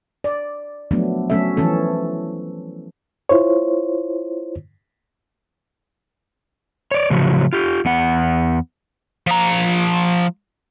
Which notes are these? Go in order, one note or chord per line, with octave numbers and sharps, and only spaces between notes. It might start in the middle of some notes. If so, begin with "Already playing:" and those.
D5
F3 F#3 A3 B3 D4
F#3 A3 C#4 A4 E5
E3 F3 C#4 A4
E4 F4 C5 C#5
C#5 D5
A2 C#3 F3 F#3 F#4
F4 G4
E2 B3 F#5
F3 A#5